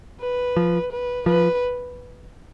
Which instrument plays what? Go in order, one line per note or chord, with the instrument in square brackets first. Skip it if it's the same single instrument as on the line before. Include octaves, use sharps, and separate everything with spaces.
[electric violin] B4
[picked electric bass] F3
[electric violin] B4
[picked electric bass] F3 [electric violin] B4